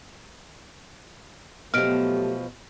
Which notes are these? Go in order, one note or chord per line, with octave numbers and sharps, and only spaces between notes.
B2 F3 F#3 A3 G4 F6 D7